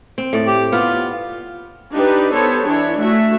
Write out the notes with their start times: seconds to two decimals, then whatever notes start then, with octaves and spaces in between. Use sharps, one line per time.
0.18 C4
0.33 A2 D5
0.47 G4
0.73 B3 F4
1.94 D4 D#4 G4 B4
2.33 B3 A4 C5 C#5
2.66 E3 D4 E4 C#5
2.99 A3 F#4 E5